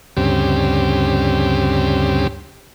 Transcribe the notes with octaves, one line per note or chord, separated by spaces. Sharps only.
D2 G2 C#3 C4 G4